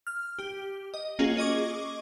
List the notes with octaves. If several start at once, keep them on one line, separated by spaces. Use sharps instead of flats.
F6
G4
D#5
A#3 C#4 F4 F#4 G#4
G#4 D#5 C#6 D6